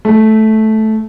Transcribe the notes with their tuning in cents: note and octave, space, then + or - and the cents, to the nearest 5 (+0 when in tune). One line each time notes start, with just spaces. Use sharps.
A3 -10